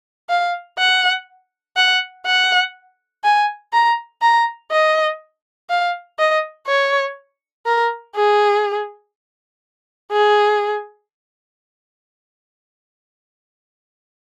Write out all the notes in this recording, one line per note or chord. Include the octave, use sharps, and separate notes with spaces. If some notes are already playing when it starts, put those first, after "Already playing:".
F5
F#5
F#5
F#5
G#5
A#5
A#5
D#5
F5
D#5
C#5
A#4
G#4
G#4